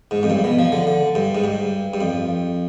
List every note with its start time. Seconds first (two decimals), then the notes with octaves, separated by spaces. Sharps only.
0.11 G#2
0.23 F2
0.30 G2
0.44 B2
0.59 F3
0.72 D3
0.87 D3
1.15 G2
1.35 G#2
1.44 G2
1.94 G2
2.01 F2